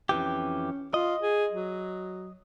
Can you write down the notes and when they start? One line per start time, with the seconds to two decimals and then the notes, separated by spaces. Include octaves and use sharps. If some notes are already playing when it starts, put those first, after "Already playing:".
0.09 F2 E3 C#4 G4
0.94 F4 D#5
1.22 G#4
1.52 F#3